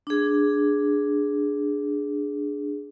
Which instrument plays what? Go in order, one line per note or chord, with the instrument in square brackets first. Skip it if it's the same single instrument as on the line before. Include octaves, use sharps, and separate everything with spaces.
[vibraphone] D4 G#4